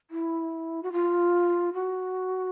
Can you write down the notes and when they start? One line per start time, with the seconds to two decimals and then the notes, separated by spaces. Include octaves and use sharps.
0.11 E4
0.83 F#4
0.92 F4
1.74 F#4